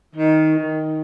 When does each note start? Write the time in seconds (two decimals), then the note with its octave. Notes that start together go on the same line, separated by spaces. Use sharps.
0.14 D#3
0.56 D#3